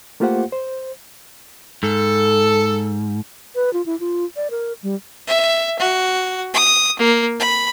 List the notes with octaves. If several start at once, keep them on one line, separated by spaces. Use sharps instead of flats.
A3 A#3 F4 G4 C5 F#5
C5
G#2 A4
B4
F4
E4
F4
D5
A#4
G3
E5
F#4
D#6
A#3
B5